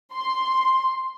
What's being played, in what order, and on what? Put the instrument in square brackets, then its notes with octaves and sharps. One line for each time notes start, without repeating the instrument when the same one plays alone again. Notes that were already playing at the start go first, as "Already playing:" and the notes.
[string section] C6